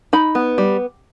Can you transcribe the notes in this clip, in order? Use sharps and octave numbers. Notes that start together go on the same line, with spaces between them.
D#4 B5
B3
G3